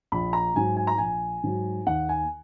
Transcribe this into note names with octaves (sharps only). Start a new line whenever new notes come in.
A#1 B5
A#5
G#2 F#3 G#5
G#5
A#5
A#1 G#5
G#2 F#3
D#2 F#5
G#5